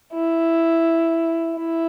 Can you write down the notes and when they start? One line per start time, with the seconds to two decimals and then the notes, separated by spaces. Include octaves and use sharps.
0.14 E4
1.58 E4